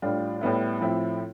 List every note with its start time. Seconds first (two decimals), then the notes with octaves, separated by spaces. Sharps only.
0.02 A2 G3 D4 F4
0.41 A2 G3 B3 E4
0.80 A2 F3 C4 E4